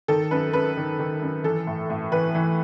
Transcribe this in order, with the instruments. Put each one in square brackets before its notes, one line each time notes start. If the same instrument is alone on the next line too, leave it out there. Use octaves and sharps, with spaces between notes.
[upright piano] D#3 A4
F#2 B4
F#2 B4
D#3
D#3
F#2
E3 A4
A2
A2
E3 B4
E3